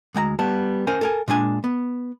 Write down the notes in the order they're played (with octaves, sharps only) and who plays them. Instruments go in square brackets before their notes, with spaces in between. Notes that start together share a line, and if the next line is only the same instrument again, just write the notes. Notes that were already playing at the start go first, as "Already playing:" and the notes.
[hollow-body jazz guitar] D2 G#3 G5 A#5
G3 B3 A5
C#4 A#4 C5 G#5
A4 A#4 G#5
A#2 G#3 D4 G#5
B3